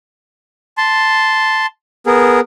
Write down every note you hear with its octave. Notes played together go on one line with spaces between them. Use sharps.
A5 C6
B3 G#4 A#4